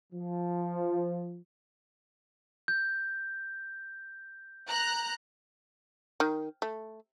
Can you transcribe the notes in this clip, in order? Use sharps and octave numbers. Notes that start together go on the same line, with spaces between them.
F3
G6
A#5 F#6
D#3
A3